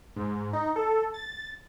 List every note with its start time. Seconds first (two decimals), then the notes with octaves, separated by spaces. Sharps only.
0.16 G#2
0.53 D#4
0.76 A4
1.14 A6